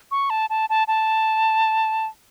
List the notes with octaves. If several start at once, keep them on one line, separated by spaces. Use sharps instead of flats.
C#6
A5
A5
A5
A5